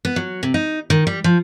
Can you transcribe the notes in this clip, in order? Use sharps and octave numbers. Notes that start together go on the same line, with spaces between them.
B3
F#3
C3
D#4
D#3
G3
F3